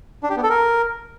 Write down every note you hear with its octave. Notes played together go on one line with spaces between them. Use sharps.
D4
G4
B3
A4
A#4